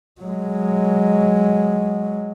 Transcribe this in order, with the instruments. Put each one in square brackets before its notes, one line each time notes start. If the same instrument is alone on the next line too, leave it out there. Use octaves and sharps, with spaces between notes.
[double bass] F#3 G#3